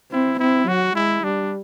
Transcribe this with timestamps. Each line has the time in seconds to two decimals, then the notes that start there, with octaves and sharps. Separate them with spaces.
0.11 C4 E4
0.39 C4 E4
0.67 F#3 F#4
0.95 G#3 E4
1.24 G3 D4